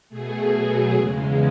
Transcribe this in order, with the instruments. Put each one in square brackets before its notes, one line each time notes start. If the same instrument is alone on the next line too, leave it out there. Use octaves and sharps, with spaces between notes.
[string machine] B2 A3 G#4
B2 F#3 A3
E2 C#3 G#3